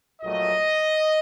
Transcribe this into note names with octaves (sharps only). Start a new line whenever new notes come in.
A#1 A#2 F#3 A3 D#5